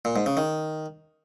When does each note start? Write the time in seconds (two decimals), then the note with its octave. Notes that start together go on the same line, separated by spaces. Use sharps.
0.05 A#2
0.16 G#2
0.26 C#3
0.37 D#3